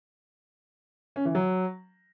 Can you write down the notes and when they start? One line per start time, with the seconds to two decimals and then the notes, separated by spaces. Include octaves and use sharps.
1.16 C#4
1.25 E3
1.35 F#3